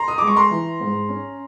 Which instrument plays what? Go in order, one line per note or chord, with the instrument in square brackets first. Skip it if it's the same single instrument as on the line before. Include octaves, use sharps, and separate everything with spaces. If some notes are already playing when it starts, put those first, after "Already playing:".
Already playing: [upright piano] A#5 C6
D#6
G#3 D6
C#6
A#5 C6
E3
G#2
C#4